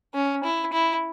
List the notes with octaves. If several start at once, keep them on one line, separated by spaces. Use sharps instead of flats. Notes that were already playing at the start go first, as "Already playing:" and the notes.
C#4
E4
E4